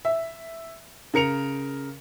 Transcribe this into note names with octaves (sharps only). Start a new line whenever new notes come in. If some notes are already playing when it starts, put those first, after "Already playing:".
E5
C#3 A#4 C#7 F7